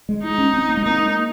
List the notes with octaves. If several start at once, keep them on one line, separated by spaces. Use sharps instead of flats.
G#3
D#4
C#4
C4
A#3
G#3
A#3 D#4